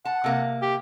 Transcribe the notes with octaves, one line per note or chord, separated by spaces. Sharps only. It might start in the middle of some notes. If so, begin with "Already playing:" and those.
F#5 A5
C3 A#3
G4